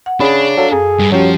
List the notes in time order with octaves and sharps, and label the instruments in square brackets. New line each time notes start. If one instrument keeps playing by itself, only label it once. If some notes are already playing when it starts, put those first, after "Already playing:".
[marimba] F#5
[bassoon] C#3 [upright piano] C#4 G#4 B5 [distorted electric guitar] D4
[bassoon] F#3 [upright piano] A4 F5
[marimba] F#2 [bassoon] G#4
[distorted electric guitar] G2 [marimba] G3
[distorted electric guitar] F3 [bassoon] F#3 [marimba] C#4 G4 G5